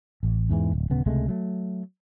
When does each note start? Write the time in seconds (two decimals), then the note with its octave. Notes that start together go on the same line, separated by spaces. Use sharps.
0.23 A1
0.50 E2 G#2 E3
0.73 D1
0.90 D1 C#3 B3
1.06 C#2 C3 G#3 A3
1.28 F#3 A3